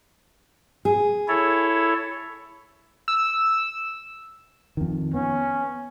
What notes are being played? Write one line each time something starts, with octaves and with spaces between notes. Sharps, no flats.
G#4
E4 A4 C#5
E6
F2 D#3
B3 C#4